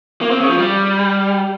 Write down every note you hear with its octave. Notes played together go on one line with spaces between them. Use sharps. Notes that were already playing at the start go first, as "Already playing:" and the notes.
A#3
C4
C#3
F3
G3